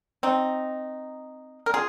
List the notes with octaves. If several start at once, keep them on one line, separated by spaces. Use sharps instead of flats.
C4 D#4
A#4
F4 G#4